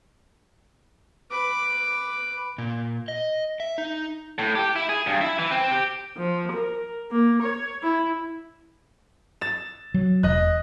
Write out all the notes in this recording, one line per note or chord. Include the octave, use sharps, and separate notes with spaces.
B4 D6
A#2
D#5
E5
D#4
A2
G4
E4
G#4
G2
E4
E3
C4
G4
F3
A#4
A#3
C#5
E4
A6 E7
F#3
E1 D#5 F#6